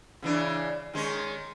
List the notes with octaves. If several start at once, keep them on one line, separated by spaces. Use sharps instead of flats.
C#3 E3 D4
D#3 G#3 C#4